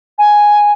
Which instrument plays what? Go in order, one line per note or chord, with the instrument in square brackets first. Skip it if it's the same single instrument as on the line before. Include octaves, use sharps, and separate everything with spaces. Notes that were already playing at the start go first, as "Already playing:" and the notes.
[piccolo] G#5